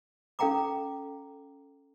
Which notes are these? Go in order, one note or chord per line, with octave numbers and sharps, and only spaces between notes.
C#4 A4 F5 G5 A#5 D6